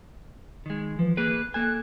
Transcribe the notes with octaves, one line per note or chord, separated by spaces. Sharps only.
D#3 G#3
E3 F3
A#3 G#4 B4 F#6
A#3 A4 G#5 F#6